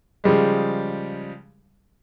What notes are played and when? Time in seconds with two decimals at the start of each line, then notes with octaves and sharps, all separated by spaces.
0.24 C#3 F3 G3 G#3